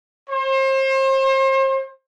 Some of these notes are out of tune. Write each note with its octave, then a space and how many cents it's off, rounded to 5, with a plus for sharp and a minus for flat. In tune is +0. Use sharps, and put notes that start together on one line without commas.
C5 +35